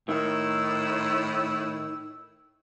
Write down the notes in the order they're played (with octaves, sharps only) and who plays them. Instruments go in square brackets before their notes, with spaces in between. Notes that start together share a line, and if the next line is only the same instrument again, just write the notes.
[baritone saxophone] A2 [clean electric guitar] D#3 [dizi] E6